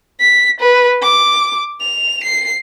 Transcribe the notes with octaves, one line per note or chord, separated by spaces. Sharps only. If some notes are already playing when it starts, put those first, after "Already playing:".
B6
B4
D6
F7
C7